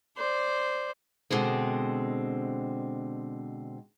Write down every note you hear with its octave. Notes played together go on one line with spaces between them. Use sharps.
C5 D5
B2 D3 G#3 C4